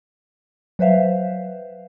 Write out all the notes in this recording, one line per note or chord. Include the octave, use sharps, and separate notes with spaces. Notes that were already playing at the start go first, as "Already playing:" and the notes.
F#3 B4 C5 E5 F5